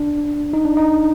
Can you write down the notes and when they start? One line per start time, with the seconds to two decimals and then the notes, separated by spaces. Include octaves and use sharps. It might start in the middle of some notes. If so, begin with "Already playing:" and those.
Already playing: D4
0.53 D#4
0.65 D4
0.77 D#4